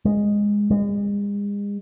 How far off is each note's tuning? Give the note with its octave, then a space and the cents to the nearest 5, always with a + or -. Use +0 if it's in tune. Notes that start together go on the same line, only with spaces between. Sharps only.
G#3 -10
G#3 -40